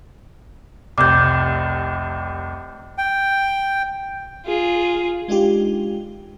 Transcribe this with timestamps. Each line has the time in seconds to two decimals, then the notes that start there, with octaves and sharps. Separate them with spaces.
0.98 F1 C2 D6 G6
2.98 G5
4.46 F4 G#4
5.28 G#3 D4 D#4 F4 G4